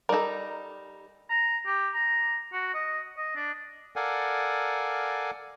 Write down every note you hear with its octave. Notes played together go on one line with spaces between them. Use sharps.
G3 D#4 A4 A#4
A#5
G4
A#5
F#4
D#5
D#5
D4
A4 A#4 D5 F5 F#5 G#5